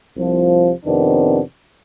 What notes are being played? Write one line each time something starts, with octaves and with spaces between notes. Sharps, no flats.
C2 C3 F3
F2 C3 D#3 B3 D4